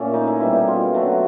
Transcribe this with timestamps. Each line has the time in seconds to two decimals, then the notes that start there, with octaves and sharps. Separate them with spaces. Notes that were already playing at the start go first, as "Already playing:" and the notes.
Already playing: A#2 A3 C#4
0.14 D#4
0.27 E4
0.40 B2 G3 E4
0.68 F4
0.94 D3 F#3 A3 F#4